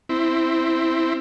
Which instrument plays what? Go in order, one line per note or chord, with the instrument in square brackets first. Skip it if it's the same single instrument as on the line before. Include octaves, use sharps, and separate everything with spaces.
[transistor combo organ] C4 E4